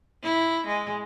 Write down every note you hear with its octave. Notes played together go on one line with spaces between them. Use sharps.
E4
G#3